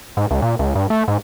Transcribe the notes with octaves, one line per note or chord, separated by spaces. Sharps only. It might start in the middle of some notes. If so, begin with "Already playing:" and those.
G#2
C#2
A#2
C#2
G2
A3
G#2